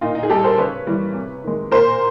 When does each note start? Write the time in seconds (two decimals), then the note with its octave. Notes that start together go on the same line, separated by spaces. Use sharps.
0.01 A#2 D#4 F4
0.15 D#4
0.23 G#4
0.29 G3 G4 A4
0.43 A#4 C5
0.58 C#3 B4 C#5
0.87 E3 G3
1.14 C3
1.44 D#3 G#3
1.71 A#2 A#4 C5